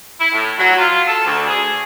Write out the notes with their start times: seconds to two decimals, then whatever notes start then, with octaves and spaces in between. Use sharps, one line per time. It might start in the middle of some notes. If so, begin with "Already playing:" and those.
0.19 E4
0.33 A2
0.58 F#3
0.78 F4
1.07 A4
1.25 D2
1.47 G#4